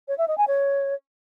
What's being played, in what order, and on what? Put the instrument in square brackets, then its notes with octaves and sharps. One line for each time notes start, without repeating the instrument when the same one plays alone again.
[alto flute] C#5
E5
D#5
G#5
C#5